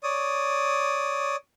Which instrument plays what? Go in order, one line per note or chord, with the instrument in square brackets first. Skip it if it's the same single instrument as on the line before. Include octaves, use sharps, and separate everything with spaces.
[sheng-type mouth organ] C#5 D5 D#6